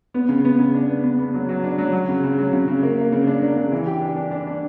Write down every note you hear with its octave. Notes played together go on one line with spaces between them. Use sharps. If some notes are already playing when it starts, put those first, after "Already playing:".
B3
C#3
B3
C#3
D4
B3
B3
B3
F#3
F#3
D4
F#3
F#3
C#3
C#3
F#3
C#3
C#3
A#3
A#3
C#3
D4
D4
C#3
E3
G4
D4
D4
D4
D4